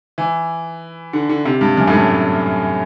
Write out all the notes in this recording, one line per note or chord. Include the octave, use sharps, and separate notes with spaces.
E3
D3
D3
C3
G2
F#2
A2
G2